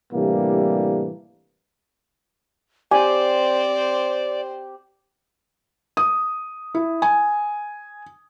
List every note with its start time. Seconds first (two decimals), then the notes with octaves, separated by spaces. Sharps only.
0.13 A2 C3 E3 G3 A#3 D4
2.91 C4 G4 C5 D5 G#5
5.97 D#6
6.74 E4
7.02 G#5